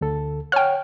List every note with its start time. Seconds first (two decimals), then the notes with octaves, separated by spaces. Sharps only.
0.01 D2 D3 A4
0.52 C#5 F#5 G5 F6